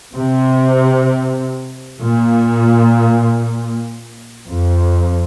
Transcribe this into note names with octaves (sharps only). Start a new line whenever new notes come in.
C3
A#2
F2